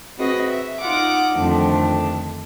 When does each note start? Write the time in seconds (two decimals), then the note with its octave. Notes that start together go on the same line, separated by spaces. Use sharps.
0.17 C4 F#4 G#4 B4 D#5
0.50 E5
0.80 D#4 F4 F#5 D6
1.33 F2 D3 D#3 A3 C4 D4